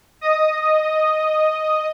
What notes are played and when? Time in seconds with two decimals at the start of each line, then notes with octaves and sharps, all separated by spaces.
0.21 D#5 D#6